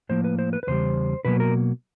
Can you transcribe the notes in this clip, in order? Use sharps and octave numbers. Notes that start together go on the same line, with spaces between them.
A2 F3 A#3 C5
B4
C5
B4
B4
E2 C#3 G3 C5
B2 F#3 A#3 B4
A#4